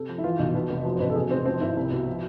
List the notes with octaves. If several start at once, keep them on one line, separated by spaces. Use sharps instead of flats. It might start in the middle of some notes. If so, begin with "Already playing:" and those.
Already playing: C3 A4
F3
E4
E3 F4
B1
B2 B4
F1
F3
C5
A1 B4
A4
B2 G#4
F1 C4
F3 C4
G#1 E4
C2
B2
F3